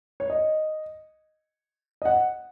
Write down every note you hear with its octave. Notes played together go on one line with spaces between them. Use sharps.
C#5
D#5
D#5
F#5